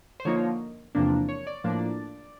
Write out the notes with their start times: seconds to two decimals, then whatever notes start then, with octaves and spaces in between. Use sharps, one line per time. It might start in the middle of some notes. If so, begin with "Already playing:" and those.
0.20 C5
0.25 D3 F3 A#3 D#4 C#5
0.95 E2 C3 F3 A#3 D4
1.29 C#5
1.47 D5
1.64 A2 F3 A#3 D4